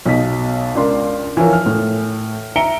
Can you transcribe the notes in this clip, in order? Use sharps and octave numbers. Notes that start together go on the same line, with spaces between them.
B1 B2 D#5 B6
C#2 D4 A#4 C6
E3 F3 A#4 C#5
F6
A2
E5 A#5 C#7 D7 G7